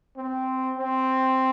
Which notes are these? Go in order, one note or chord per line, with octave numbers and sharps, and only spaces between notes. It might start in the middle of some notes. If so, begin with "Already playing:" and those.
C4
C4